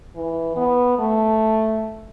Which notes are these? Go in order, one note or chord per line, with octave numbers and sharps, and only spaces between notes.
E3
B3
A3